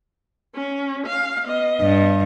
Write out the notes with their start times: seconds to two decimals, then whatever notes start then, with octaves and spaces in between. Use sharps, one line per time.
0.55 C#4
1.07 F5
1.45 B3 D#5
1.81 G2